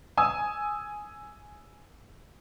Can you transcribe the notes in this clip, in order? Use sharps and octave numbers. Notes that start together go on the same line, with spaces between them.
G#5 D#6 E6